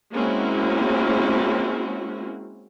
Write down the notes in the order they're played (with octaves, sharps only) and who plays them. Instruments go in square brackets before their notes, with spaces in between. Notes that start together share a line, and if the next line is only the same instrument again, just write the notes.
[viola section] G#3 A#3 C4 C#4 E4 F#4